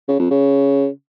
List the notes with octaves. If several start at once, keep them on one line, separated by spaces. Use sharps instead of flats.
C#3
F2
C#3